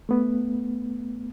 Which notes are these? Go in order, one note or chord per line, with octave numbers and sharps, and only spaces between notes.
A3 B3